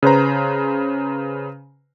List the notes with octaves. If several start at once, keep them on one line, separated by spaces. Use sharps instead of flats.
C#3 B4 C5 A#5